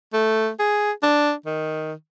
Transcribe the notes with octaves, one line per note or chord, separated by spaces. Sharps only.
A3
G#4
D4
D#3